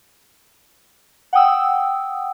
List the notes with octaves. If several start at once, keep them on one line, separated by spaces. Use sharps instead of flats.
F#5 G5 D#6 E6